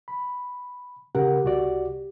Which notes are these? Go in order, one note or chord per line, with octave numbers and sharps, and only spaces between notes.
B5
C#3 G4 A#4 F#5
C2 F#4 D5